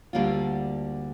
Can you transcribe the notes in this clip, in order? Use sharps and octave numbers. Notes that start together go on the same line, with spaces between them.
D2 D3 G3 A#3 F4